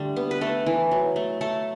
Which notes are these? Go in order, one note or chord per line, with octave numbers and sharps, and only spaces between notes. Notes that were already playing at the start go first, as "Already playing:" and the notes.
Already playing: D3 G3 A3
B3
B4
A3 A4
E3
F#3
A3
A3 A4